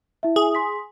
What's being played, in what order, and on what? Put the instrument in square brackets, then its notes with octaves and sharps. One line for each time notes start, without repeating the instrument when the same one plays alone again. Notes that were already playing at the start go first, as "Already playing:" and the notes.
[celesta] E4 E5
[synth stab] G#4
[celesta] C6 B6